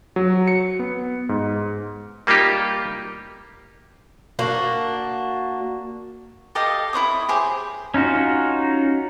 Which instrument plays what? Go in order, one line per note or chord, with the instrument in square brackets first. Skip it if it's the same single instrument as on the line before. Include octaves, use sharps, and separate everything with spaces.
[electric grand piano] F#3
C#7
B3
G#2
[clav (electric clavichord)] G3 A#3 D#4 F4 G4
[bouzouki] A#3 D4 F#4
[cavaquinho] G4 A4 D#5 F5
E4 C5 C#5 D#6
G4 G#4 C5
[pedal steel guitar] C#4 D#4 F4 F#4